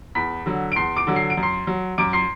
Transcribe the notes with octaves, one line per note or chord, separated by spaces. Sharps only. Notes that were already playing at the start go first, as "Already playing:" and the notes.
E2 B5 B6
D3 F#3
D7
E2 C6 C7
D6 D7
D3 F#3
C7
D7
F#2
C6 C7
F#3
F#2 D6 D7
C6 C7